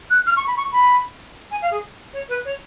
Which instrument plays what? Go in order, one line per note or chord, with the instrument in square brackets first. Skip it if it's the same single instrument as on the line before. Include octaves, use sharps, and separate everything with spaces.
[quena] F#6
F6
C#6
B5
C#6
B5
G#5
F5
G#4
C#5
B4
C#5